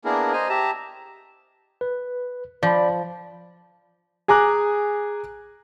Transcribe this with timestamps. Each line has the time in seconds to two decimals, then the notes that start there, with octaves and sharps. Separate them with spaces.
0.05 A#3 B3 D4 E4 G#4 A#4
0.33 C5 D#5 G#5 A#5
0.49 G4 E5 A5 A#5
1.81 B4
2.63 F3 D5 B5
4.28 G#4 G#5 A#5 D6 F#6